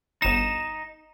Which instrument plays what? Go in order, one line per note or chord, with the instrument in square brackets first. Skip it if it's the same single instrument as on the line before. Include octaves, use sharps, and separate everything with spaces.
[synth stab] G1 E7 [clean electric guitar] D#4